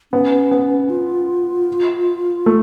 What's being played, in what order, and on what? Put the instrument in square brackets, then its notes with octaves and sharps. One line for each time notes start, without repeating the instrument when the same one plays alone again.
[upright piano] B3 [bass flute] C#4
[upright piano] B3
[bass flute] F4
[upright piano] A3